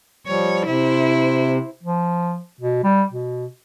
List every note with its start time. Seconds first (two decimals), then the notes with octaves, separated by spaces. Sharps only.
0.27 F3 G3 C#5
0.66 C3 E4 C5
1.83 F3
2.61 B2
2.84 G3
3.12 B2